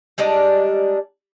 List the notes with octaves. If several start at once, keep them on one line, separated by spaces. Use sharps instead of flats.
G3 G#3 D4 D#4